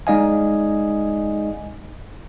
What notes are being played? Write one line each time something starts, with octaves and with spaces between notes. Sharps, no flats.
G#3 D#4 D5 D#5 F5 G#5